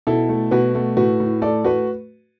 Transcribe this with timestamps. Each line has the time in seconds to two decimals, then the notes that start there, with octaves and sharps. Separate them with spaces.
0.07 B2 E4 A4
0.29 A3
0.51 B2 F#4 B4
0.75 A3
0.97 A2 F#4 B4
1.20 A2
1.42 A3 A4 D5
1.64 A3 F#4 B4